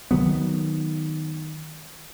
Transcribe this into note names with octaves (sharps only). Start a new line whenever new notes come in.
D#3 F3 F#3 B3